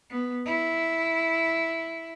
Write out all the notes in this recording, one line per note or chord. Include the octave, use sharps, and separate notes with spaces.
B3
E4